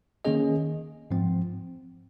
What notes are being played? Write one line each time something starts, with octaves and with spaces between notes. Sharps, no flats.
D#3 A#3 C#4 G#4 D#5
G#2 F3 C4